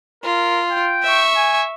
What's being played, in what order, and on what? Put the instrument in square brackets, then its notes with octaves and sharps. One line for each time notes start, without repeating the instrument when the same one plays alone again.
[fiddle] F4 [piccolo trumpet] A#4
[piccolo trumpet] G5
[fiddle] E5 C#6
[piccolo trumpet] G#5